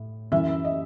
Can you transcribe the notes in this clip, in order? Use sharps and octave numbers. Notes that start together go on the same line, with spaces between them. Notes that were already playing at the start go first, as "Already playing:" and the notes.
Already playing: A2
F#2 E3 E5
D#5